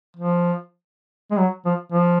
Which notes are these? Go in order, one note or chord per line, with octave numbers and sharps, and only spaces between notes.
F3
G#3
F#3
F3
F3